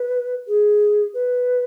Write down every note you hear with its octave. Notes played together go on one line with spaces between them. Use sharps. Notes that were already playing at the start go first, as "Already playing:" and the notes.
Already playing: B4
G#4
B4